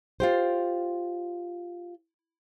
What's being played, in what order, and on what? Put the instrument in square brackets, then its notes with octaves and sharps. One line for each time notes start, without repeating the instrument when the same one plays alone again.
[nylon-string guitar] F4 G4 C5